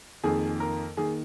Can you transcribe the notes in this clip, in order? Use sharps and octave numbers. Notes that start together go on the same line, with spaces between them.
F2 D#3 A#3 G#4
A#4
D#3 A#3 G#4